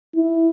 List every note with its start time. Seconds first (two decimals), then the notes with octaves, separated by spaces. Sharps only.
0.16 E4